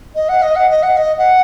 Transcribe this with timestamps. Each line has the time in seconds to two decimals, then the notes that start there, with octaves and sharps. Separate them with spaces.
0.15 D#5
0.28 F#5
0.42 D#5
0.55 F#5
0.69 D#5
0.82 F#5
0.97 D#5
1.18 F#5